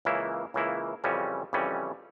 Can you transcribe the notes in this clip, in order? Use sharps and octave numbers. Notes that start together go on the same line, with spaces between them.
C#2 C#3 E3 A#3 E4
C#2 C#3 E3 A#3 E4
F2 C#3 E3 G3 C#4
F2 C#3 E3 G3 C#4